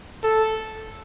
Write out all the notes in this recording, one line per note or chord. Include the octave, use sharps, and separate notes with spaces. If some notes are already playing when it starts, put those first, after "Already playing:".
A4